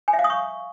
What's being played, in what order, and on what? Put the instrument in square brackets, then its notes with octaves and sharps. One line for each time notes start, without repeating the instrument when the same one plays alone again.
[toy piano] G#5
E5
F5
D#6
C#6